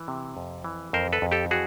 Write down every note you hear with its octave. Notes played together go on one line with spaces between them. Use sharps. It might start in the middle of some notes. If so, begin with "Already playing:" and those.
Already playing: E3
C3
F2
E3
F2 A#4 C5
A4 B4
F2
G4 A4
E3 F#4 G#4